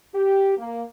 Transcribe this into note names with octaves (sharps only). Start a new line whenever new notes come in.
G4
A#3